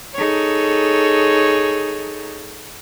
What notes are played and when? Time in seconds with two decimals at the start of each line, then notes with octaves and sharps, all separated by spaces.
0.15 D#4 G#4 A4 C#5